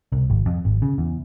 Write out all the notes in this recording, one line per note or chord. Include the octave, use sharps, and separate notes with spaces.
C2
G#1
F2
G#1
C#3
E2